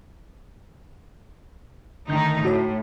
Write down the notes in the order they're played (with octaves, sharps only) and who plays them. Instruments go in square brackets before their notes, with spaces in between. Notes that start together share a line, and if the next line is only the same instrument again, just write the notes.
[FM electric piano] G1 D3 G6 [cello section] D#3 A3 D#4
[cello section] A2 [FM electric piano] F#4 C#5